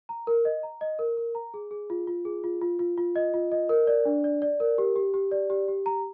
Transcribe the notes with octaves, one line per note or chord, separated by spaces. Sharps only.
A#5
A#4
D#5
A#5
D#5
A#4
A#4
A#5
G#4
G#4
F4
F4
G#4
F4
F4
F4
F4
D#5
F4
D#5
A#4
D5
D4
D5
D5
A#4
G4
G4
G4
D5
G4
G4
A#5